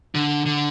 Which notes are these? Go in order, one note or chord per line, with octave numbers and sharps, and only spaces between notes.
D3
D3